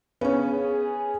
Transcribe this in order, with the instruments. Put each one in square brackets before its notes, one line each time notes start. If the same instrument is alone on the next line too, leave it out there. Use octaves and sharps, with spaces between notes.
[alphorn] C#3 [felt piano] B3 C#4
[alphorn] G#4